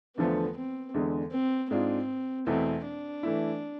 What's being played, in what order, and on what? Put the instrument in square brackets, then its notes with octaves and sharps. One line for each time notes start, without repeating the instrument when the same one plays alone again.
[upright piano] E2 D3 F3 A3 [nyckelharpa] B3
[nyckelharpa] C4
[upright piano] E2 D3 G#3
[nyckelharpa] C4
[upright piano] G#2 G#3 D4 F4 [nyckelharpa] C4
[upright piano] E2 B2 A3 E4 [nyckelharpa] C4
[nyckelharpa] D4
[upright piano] E3 A3 E4